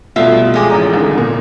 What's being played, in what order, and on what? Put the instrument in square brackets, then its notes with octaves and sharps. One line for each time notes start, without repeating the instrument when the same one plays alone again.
[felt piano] B2 G3 A3 [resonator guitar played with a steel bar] F4 E5
[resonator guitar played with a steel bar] F3 G#3 [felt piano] A3 G5 D6
[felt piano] A1 D5 A#5
C2 D3 D#3
A#2 A#3